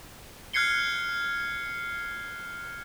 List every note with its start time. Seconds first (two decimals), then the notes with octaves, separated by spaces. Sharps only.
0.53 F6 F#6 G#6 C7 C#7 G7